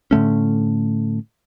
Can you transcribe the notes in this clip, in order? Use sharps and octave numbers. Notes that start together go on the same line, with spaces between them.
A2 D3 A3 C#4